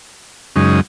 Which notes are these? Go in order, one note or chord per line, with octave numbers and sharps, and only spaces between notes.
F#2 C#3 G#3 D#4